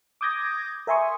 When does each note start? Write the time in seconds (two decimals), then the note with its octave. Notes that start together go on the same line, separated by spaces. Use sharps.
0.21 D6 D#6 G6 G#6 A#6
0.87 A#4 E5 G#5 C6 C#6 D#6